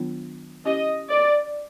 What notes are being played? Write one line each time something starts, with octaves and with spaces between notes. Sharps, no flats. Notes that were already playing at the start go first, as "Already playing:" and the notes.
Already playing: D#3 F#3 B3 D4 F4
C#4 E4 G4 D#5
D5